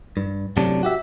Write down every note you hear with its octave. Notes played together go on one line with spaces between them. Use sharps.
G2
F#2 A2 C3 F#3 D4
F#4 G4 E5